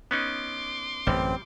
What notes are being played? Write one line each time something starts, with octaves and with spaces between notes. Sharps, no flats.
B3 C#4 D#4 C6 D6
A1 F#2 G3 C4